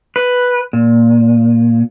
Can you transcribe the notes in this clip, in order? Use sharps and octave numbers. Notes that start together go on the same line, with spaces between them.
B4
A#2